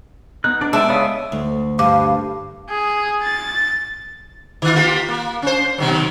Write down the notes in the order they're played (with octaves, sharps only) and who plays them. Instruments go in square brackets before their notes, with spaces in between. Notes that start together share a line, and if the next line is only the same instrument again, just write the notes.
[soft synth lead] B3 [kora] D#4 [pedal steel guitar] F#6
[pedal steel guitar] D4 [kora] D5
[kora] G#3 D4 [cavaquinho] D5 E5 [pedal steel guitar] G5 A5
[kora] C#3 [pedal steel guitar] B3 D#6 [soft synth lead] C#5
[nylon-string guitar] D2
[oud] G2 [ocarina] F5 [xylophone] D6
[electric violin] G#4
A6
[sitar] D#3 F4
A#3 F4 G4
A#3
C#4 C5
B2 D#3 F#3